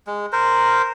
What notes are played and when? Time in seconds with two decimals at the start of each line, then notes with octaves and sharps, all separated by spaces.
0.07 G#3
0.32 A#4 C5